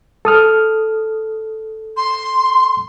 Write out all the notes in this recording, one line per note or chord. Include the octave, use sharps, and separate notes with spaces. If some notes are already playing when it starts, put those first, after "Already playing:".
A4 D#6 F6
C6